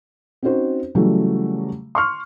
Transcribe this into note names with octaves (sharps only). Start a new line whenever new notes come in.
C4 C#4 D#4 F#4 C5
C#3 E3 F#3 G3 A3
C6 C#6 F6